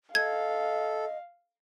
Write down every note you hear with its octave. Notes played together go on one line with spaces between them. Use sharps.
A4 D#5 F5 G#6